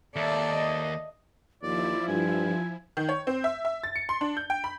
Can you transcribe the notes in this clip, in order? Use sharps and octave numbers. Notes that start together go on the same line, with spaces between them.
D#2 A4 D5 E5
D#5
D#2 F3 E4 F4 D5
G2 G#5
D#3
C#5
C4
E5
E5
A6
C#7
C6
D4
G6
G5
B5